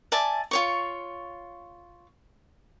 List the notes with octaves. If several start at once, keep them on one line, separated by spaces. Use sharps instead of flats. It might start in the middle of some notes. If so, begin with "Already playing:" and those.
D5 E5 G#5 A5
F4 C#5 C#6